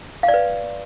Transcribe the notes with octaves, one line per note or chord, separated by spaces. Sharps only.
F5
D5
B4